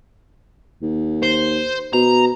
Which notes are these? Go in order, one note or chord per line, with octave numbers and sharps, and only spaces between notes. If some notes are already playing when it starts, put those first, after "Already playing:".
D#2
C5
B2 A#5